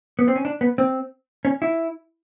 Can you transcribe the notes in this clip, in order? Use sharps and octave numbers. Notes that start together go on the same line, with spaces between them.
B3
C4
C#4
D4
B3
C4
C#4
E4